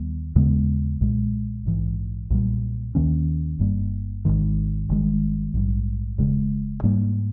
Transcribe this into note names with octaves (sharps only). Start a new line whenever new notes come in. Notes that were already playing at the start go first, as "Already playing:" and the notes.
Already playing: D#2 D#3 G3 B3
D#2 C#3 G#3 B3
B1 A#2 G#3
A#1 G#2 E3
B1 A#2 G3
D#2 D#3 A#3 C#4
G1 G2 G3 A#3
G#1 G#2 D#3
G1 G2 D#3 G#3
A#1 G#2 G3
E1 E2 C#3 G#3
G#2 G3 A#3